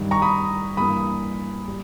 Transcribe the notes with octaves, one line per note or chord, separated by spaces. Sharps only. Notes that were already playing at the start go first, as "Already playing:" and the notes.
Already playing: G2 D#3 G3
A#5 C#6
B5 D#6
G2 E3 A#3 B5 D#6
G3